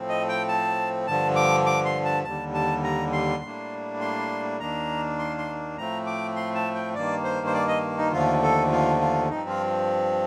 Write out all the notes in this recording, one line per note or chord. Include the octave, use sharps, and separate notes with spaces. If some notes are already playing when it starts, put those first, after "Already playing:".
Already playing: A2 F3 C4
D#5
G5
A5
G2 D3 F3 A5
D6
D6
C6
A5
D#2 D3 G3 A5
A5
A#5
C6
A2 G3 A#3 D4
C6
D#2 D#3 A#3 D4 A#5
C6
C6
A2 F3 A3 C4 A#5
D6
C6
A5
G5
G2 D#3 A#3 D5
C5
C5
D5
D#5
D#4
D#2 D3 F3 A3 F4
A4
F4
F4
G2 F3 C4 D#4
F4